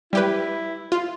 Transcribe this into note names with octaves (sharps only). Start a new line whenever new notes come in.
G3 E4 G4 B4
F4